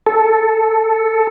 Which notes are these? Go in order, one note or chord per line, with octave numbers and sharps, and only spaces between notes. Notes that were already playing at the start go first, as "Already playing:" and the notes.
A4